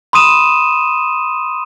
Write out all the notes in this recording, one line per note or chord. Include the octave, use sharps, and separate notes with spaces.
B5 C6 D#6 D#7 E7